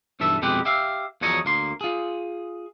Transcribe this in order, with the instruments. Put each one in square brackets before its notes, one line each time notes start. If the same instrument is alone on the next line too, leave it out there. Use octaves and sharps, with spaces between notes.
[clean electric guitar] B1 G2 E3 A4 E5
F2 B2 G#3 C4 G4 B4
G4 E5 F5
E2 F3 F#3 C#5 D#5 A#5
D2 A#3 C6
F4 G#4